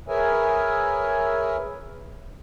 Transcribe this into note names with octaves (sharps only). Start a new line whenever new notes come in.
G#4 A#4 B4 C#5 E5 G#5